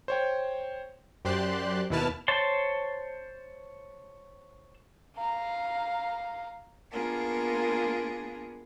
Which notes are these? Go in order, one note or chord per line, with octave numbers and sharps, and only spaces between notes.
C5 C#5 G5
F#2 G4 C5 D5 C6 F#6
D#2 B2 E4 B4 A5 F6
C5 C#5 A5 C6
F5 A#5
A#3 B3 D4 F4 G#4 A#4